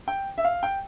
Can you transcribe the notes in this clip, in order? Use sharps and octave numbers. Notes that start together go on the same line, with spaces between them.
G5
E5
F5
G5